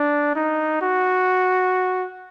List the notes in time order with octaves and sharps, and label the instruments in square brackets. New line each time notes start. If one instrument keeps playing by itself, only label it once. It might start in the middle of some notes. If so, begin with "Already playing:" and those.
Already playing: [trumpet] D4
D#4
F#4